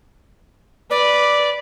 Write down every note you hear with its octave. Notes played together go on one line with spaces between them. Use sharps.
B4 D5